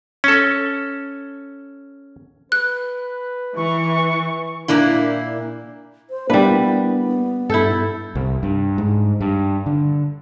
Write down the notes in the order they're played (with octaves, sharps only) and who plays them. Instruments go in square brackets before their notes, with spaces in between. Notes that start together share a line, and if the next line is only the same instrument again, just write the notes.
[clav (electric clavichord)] C#4 A4
[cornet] B4 [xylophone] F#6
[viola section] E3 [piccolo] C#6
[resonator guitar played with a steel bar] A#2 A#3 D4 E4
[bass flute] C5
[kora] G3 B4 [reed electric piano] A#3 D4 E4 [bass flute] B3
[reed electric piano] G2 G6 [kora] E4 A4
[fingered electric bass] C2
G2
G#2
G2
D3